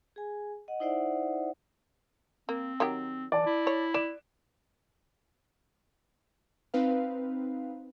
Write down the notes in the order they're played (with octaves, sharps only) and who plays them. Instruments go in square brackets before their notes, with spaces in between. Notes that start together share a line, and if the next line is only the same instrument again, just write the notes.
[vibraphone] G#4 G#5
D#5 F#5
D#4 E4 C5 D5 E5 F#5
[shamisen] A#3 [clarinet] C4
[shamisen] D#3 F#3 G4
[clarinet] E3 [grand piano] D5 A5
[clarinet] E4
[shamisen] C#5
[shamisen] D5 [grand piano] E7
[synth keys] C4 D#4 B4 F5